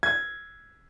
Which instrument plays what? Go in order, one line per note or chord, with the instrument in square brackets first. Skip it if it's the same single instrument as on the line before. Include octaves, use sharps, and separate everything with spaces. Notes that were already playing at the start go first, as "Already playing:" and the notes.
[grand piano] G#6